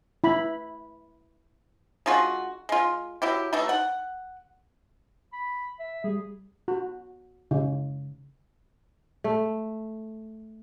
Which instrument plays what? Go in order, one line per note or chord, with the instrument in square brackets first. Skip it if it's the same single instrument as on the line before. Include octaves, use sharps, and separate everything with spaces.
[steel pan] E4 B5
[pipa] G#3 D4 F4 F#4
G#3 F4
F#3 E4 G4
E3 F#3 A3 D#4
F#5
[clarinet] B5
E5
[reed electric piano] G3 [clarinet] G#4
[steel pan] F#4
C#3
[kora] A3